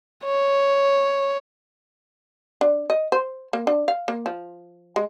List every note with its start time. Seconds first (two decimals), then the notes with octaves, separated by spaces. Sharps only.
0.24 C#5
2.61 D4
2.90 D#5
3.12 C5
3.53 A#3
3.67 D4
3.88 F5
4.08 A#3
4.26 F3
4.96 G#3